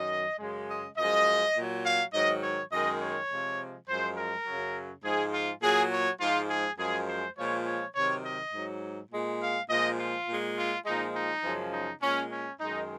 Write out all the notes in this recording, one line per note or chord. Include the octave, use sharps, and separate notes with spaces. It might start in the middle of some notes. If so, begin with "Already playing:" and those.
Already playing: F#2 D#3 F#3 D#5
F#2 C#3 G#3
D#5
F#2 F3 G#3 D#5
A#2 F#3
F5
G#2 D#3 F#3 D#5
C#5
F#2 D#3 G#3 D#5
C#5
C3 F3 G#3
F#2 F3 G#3 C5
A#4
F#2 C#3 F#3
G#2 F3 G#3 G#4
F4
A#2 F#3 G#4
C#5
G#2 F3 G#3 F4
G#4
F#2 F3 G#3 G#4
C5
A#2 F3 G#3 C#5
C#5
C3 D#3 F#3 C#5
D#5
G#2 F#3
A#2 G#3
F5
A#2 F3 G#3 D#5
F4
A#2 G#3
F4
A#2 F3 G#3 D#4
D#4
F#2 C#3 F3 G#3
D#4
A#2 G#3 C#4
C#4
F#2 D#3 G#3 D#4